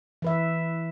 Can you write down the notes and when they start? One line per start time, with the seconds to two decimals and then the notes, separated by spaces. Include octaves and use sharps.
0.22 E3 B4 E5